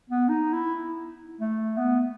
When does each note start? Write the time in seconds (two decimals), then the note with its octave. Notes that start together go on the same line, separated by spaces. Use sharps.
0.10 B3
0.29 D#4
0.53 E4
1.40 A3
1.78 B3